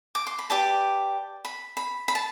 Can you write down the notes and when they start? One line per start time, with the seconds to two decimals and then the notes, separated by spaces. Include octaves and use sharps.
0.15 D6
0.27 C6
0.39 B5
0.50 G4 B4 D5 A5
1.45 B5
1.77 B5
2.08 B5
2.15 A5